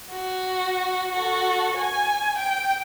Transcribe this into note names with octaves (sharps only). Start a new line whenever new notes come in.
F#4
F#4 A4
G#5
G5